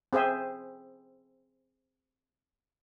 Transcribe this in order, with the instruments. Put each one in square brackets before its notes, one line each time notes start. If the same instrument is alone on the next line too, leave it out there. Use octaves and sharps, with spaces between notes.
[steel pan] C4 G#4 C5 E5